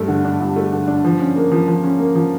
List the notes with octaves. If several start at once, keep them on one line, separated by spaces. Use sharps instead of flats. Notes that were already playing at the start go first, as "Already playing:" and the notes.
Already playing: G2 A3
D3
D4
G2
A3
D3
D4
F3
C#4
A#3
F3
F3
C#4
A#3
F3